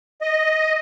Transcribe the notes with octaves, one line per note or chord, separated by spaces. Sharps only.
D#5